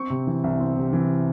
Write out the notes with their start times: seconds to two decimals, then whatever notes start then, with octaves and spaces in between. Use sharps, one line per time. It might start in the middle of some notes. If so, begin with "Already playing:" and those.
Already playing: C4 C#6
0.10 C3
0.27 E3
0.44 C2
0.60 C4
0.77 C3
0.93 E3